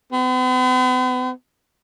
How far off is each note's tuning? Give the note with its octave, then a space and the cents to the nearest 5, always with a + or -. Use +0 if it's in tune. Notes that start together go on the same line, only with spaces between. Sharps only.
B3 +45